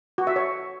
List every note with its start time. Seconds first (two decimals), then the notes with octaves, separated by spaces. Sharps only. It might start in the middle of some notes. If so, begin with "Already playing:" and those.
0.18 F#4
0.27 E5
0.36 C#5